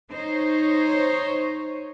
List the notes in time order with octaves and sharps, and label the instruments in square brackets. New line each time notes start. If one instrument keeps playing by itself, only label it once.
[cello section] D#4 C5 C#5